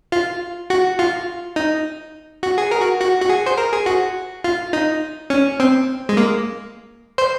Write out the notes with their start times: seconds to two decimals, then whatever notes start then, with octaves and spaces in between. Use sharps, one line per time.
0.12 F4
0.70 F#4
0.99 F4
1.56 D#4
2.43 F#4
2.58 G#4
2.71 A#4
2.81 F#4
3.01 F#4
3.22 F#4
3.29 G#4
3.46 C5
3.58 A#4
3.73 G#4
3.86 F#4
4.44 F4
4.73 D#4
5.30 C#4
5.60 C4
6.09 G#3
6.17 A#3
7.18 C5